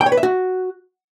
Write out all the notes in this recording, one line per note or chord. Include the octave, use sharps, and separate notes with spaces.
G5
C#5
B4
E5
F#4